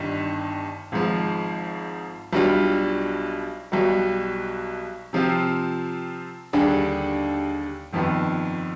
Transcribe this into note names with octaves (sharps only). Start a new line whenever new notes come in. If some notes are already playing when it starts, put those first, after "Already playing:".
Already playing: G1 G2 D#3
G#1 G#2 F3
B1 B2 G3 D4 F4
B1 B2 G3
C3 F3 C4 F4
D#2 D3 G3 D4 G#4
G1 F2 D#3 B3 F4